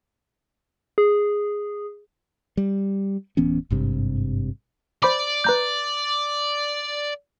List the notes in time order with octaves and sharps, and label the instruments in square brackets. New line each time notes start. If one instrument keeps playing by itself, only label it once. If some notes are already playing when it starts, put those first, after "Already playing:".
[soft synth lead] G#4
[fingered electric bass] G3
D1 E3 B3 C#4
G#1 G2 C3
[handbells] C5 B5 D6 [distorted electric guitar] D5
[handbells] B4 A#5 G6